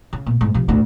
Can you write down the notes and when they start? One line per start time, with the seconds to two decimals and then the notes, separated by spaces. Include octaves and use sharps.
0.13 C#3
0.26 A#2
0.41 G#2
0.54 C3 F3
0.68 A1 D2